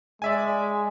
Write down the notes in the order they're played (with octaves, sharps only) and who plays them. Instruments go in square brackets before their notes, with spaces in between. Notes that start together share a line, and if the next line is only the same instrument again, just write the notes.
[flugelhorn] G#3 [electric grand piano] D5 E5 G#5